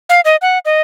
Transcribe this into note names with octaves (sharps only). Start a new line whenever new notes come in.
F5
D#5
F#5
D#5